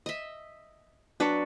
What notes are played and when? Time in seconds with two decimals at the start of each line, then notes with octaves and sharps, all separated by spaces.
0.06 D#5 E5
1.20 F#3 D4 B4 A5 C#6